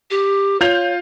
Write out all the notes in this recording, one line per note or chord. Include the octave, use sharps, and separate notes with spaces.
G4
F4 C#5 G6 F7